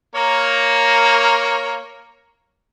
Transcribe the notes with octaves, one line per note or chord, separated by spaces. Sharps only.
A#3 A#4 C#5